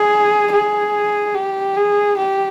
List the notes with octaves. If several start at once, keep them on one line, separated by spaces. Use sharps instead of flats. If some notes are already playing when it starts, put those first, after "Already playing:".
Already playing: G#4
G#4
G4
G#4
G4